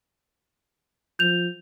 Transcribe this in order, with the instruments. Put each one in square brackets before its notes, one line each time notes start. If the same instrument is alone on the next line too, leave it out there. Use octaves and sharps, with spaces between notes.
[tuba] F3 [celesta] G6 F7